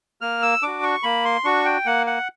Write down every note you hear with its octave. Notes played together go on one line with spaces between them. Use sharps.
A#3 F6
E6
D4 F#4 D6
C#6
A#3 B5
C6
D4 F#4 C#6
G5
A#3 F#5
F#5